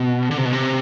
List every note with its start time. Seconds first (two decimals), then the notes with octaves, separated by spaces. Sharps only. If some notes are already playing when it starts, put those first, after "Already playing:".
Already playing: B2
0.31 D3
0.38 C3
0.45 B2
0.53 C3